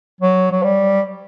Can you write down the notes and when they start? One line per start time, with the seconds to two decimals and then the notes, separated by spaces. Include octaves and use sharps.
0.21 F#3
0.52 F#3
0.63 G3